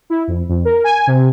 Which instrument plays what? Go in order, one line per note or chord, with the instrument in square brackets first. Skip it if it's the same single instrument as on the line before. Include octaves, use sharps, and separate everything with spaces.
[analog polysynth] E4
F2
F2
A#4
G#5
C3